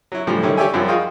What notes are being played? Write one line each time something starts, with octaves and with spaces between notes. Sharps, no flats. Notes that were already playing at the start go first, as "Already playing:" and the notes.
F#3 E4
A2 D3 E3 F3 G3
D3 D#3 G3 C#4 E4 A#4
G4 C#5 D5 E5 G5 G#5
F#2 F3 G3 C#4
F4 F#4 G#4 D#5 F5 G5